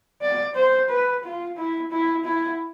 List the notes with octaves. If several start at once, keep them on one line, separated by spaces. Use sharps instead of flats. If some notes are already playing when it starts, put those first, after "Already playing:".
D5
C5
B4
F4
E4
E4
E4